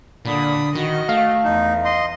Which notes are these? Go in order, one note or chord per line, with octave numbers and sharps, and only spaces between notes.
A#2 D3 B5 D#6
D#3 F#4 D#5
A3 F5
E2 D#4
D#5 C6